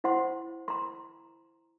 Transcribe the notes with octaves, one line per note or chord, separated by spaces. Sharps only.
E4 C5 F#5 C6
A#5 C6